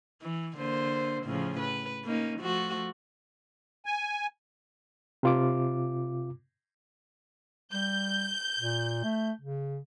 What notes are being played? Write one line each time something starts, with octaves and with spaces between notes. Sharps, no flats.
E3
D3 A#3 C5
A2 C#3 F3
B4
A#3 C#4 D#4
F3 A3 F#4
G#5
C3 F4 D6
G3 G6
A#2
A3
C#3